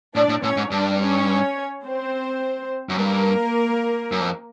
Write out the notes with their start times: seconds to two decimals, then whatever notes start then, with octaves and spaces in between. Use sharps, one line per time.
0.15 A2 D4 D5
0.29 A2
0.43 A2 C#4 C#5
0.57 G#2
0.71 G2 D4 D5
1.00 C#4 C#5
1.85 C4 C5
2.89 F#2
2.98 G2 A#3 A#4
4.12 F#2
4.20 F2